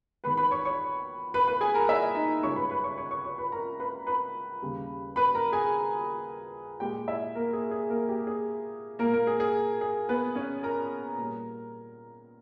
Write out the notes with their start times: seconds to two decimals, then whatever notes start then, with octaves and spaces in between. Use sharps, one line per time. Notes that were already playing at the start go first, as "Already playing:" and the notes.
0.24 E2 D#3 G#3 B4 B5
0.37 B4 B5
0.51 C#5 C#6
0.65 C#5 C#6
1.34 B4 B5
1.47 B4 B5
1.61 G#4 G#5
1.74 A#4 A#5
1.89 E4 E5
2.15 D#4 D#5
2.43 C#2 C#3 G3 C#5 C#6
2.56 B4 B5
2.70 B4 B5
2.84 C#5 C#6
2.98 C#5 C#6
3.11 C#5 C#6
3.25 C#5 C#6
3.38 B4 B5
3.52 A#4 A#5
3.80 B4 B5
4.07 B4 B5
4.62 D#2 C#3 G3
5.16 B4 B5
5.35 A#4 A#5
5.52 G#4 G#5
6.80 A#2 G#3 G4 G5
7.08 E4 E5
7.35 A#3 A#4
7.53 G#4
7.71 G#4
7.89 A#3 A#4
8.09 G4
8.27 G#4
8.99 A#2 G#3 A#3 A#4
9.13 A#3 A#4
9.27 G#4
9.40 G#4
9.81 G#4
10.09 B3 B4
10.35 C#4 C#5
10.63 A#4 A#5
11.18 A#2 G3